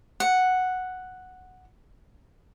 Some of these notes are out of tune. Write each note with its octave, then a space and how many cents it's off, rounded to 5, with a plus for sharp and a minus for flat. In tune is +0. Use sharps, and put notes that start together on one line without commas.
F#5 +0